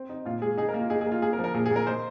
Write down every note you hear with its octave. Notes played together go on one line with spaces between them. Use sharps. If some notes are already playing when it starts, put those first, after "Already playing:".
Already playing: C4
D#4
A#2 F4
G#3 G#4
D#4 G#4
A#4
A#3
F4
D#4 G#4
G#4
A#3
F4
A#3 G#4
A#4
F3
A#4
A#2 G#4
G#4
A#2 A#4
D#4 C5